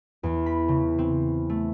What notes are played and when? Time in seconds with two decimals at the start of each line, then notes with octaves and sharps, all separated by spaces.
0.23 E2
0.46 B5
0.68 C#3
0.99 C4
1.50 A3